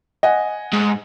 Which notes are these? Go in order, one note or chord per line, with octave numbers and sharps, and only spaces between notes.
D#5 F#5 G#5
G#2